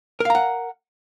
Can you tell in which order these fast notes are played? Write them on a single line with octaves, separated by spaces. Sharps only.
A#4 F5 A#5 F#5